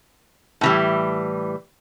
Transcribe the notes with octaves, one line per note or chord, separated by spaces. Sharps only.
A2 E3 G3